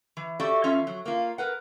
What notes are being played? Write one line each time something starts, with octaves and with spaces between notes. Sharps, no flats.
E3
F#4 G4 A4 D5 E5
E2 C#4 F4 E5
F#3
A#3 F4
A#4 B4 F#5